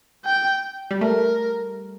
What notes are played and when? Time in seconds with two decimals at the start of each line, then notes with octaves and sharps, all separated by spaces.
0.25 G5
0.91 G3
1.01 A3 A#4